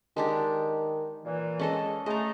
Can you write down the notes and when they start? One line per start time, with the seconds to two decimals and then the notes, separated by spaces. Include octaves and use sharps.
0.17 D#3 G#3 D4 G4
1.25 A#2 E3
1.59 G#3 C#4 A4 D#5
2.06 G#3 A3 G#4 D#5 A#5